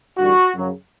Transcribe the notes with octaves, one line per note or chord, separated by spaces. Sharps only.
A1 G2 D3 G3 F#4
F#2 C#3 F#3